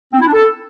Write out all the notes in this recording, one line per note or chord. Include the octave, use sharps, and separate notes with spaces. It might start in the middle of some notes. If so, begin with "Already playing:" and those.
C4
E4
D4
A4